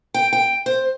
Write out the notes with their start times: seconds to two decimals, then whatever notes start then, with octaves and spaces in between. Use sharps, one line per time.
0.14 G5
0.33 G5
0.66 C5